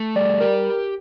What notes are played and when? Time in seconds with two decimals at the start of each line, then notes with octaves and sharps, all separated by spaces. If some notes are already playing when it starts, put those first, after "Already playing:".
Already playing: A3
0.16 G3 D5
0.41 G4 A#4